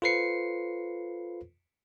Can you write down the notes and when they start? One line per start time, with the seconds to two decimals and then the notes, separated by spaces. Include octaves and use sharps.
0.02 F4 A4 B4 C5 C7 C#7